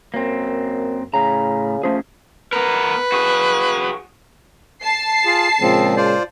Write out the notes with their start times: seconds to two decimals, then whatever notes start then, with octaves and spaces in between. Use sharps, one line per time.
0.14 F#2 A#3 C4
1.14 A2 C#3 A#5
1.83 F3 A3 C#4 G#4
2.53 B3 A#4 B4
3.12 F#4 G#4
4.84 A5 C7
5.25 F4 G#4
5.61 A#2 C#3 F3 G#3 C4
5.97 F4 C5 D5